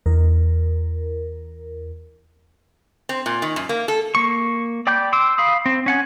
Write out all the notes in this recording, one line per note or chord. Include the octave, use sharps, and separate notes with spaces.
E2 A#4
C4
A#2
D#3
F#2
A#3
A4
A#3 C#6
D5 G5 B5 D6 G6
C6 D6 E6
F5 B5 D#6
C4
C#4 F#5 G#5